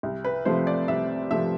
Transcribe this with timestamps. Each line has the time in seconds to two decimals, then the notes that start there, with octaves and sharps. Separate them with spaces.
0.03 C2
0.25 B4
0.45 C3 F3 A3 C5
0.67 D5
0.88 C2 E5
1.31 C3 F3 A3 E5